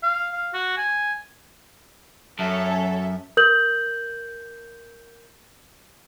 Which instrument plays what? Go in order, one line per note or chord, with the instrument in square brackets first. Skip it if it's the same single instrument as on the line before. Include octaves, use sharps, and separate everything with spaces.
[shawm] F5
F5
F#4
G#5
[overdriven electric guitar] F#2 [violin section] A4 C#5 [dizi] E5
[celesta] A#4 G6 F#7